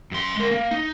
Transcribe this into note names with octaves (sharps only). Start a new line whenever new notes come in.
F#2 C6
G#3 A#4
A#3
D#4